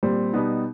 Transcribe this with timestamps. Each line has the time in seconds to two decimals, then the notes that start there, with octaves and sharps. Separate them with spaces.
0.03 A#2 G3 C4
0.33 B2 G3 B3 D#4